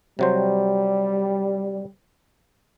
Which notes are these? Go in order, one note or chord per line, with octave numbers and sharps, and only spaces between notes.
C3 F#3 G3 C5